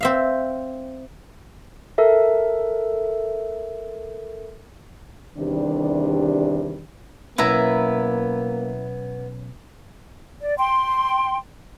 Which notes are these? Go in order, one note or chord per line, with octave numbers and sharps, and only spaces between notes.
C4 E5 F5
A4 A#4 E5
E2 C3 D#3 G3 D4
B1 A#3 B3 C#4 E4 B4 E5 A#5
D5
G5 C6